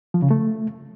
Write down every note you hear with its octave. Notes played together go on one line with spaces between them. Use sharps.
F3
C#3
A3